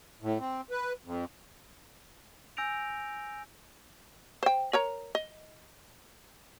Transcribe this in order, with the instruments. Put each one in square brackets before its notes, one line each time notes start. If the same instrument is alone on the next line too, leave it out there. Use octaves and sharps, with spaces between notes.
[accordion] A2
C4
B4
F2
[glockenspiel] G#5 E6 G6 A#6 D7 F7
[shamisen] C5 G5
A#4 C#5 A#5
D#5